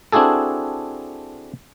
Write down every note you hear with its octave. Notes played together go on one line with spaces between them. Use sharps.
C4 D4 E4 F#4 G#4 A4